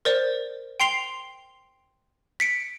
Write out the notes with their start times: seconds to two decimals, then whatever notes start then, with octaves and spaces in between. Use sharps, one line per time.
0.05 A#4 C5 D5
0.80 G5 C6 C7 F7 G7
2.40 B6 C#7 D7